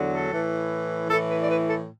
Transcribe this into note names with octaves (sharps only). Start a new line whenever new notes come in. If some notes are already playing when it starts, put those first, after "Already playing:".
Already playing: E2 D3 F#3
A4
A2 E3
A2 E3 A4
B4
D5
B4
A4